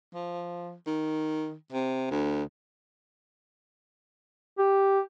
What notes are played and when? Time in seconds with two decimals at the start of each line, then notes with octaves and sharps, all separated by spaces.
0.15 F3
0.87 D#3
1.73 C3
2.11 D2
4.58 G4